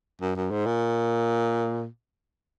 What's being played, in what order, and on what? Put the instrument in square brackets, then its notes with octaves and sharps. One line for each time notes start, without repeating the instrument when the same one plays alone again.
[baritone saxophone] F#2
F#2
G#2
A#2